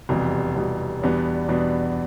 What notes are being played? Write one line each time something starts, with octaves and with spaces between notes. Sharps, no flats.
F1 E2 B2 G3
F1 E2 B2 G3
E2 B2 G3 B3 D4
E2 B2 G3 B3 D4